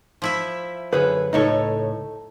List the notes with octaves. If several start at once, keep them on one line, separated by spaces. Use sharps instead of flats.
F3 E4 E5
F#2 D3 G#4 B4
C#2 A2 D#4 A4 C#5